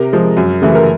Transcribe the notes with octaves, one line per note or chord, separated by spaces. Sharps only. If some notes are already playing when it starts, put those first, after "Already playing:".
Already playing: C3 A#4
F3 G#3
F#2
C#3 E3 A3
A#4